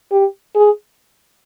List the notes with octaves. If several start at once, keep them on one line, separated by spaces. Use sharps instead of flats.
G4
G#4